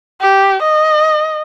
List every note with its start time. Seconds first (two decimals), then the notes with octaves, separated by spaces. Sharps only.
0.21 G4
0.62 D#5